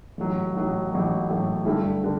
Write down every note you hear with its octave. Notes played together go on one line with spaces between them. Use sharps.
A1 A2 F#3
A1 A2 F#3
A1 A2 F#3
A1 A2 F#3
G2 D3 A3 E4
D3